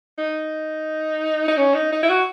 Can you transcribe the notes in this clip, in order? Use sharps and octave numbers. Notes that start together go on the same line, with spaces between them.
D#4
D#4
C#4
D#4
D#4
E4
F#4